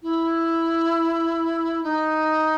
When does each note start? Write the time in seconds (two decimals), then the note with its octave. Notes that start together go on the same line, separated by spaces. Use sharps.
0.03 E4
1.84 D#4